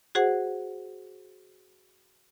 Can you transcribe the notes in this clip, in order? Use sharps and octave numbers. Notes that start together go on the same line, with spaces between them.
F#4 G#4 C5 F#5